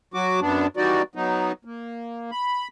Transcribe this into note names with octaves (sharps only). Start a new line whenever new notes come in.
F#3 F#4 D6
F#2 B3 D4
E3 G3 D#4 F#4 D5
F#3 B3 D#4
A#3
B5